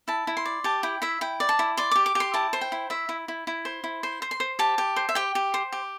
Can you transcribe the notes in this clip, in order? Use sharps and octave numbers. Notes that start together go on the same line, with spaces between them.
E4 A5
E4
C6
D5
G4 A5
E4 G5
E4 E5
E4 G5
D5
A5
E4
D5 C6
G4 D6
D6
G4 C6
E4 A5
C5
G5
E4
E4 E5
E4
E4
E4
C5
E4
C5 C6
C5
C6
C5
G4 A5
G4
C5
E5
G4 G5
G4
C5
G4